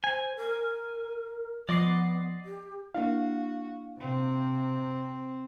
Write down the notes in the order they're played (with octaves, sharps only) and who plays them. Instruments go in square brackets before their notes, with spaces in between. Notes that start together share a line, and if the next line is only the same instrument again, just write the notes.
[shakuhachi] C5 [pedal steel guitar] G#5
[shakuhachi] A#4
[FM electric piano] F3 C7 [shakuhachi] B3 [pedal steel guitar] D5 D#5 D6
[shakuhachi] G4
[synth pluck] A#3 D4 E4 [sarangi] F#4 [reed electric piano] F5
[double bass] C3 [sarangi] C4